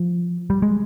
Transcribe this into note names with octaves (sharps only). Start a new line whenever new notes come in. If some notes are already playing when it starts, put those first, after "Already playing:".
Already playing: F3
G3
G#3